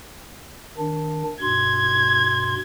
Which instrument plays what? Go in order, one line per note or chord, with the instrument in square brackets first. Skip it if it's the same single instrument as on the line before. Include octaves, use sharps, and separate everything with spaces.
[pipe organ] D#3 D4
[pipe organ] G2 B2 C6 [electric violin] G#6